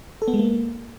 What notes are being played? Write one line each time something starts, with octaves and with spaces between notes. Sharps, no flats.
A4
B3
G#3
A#3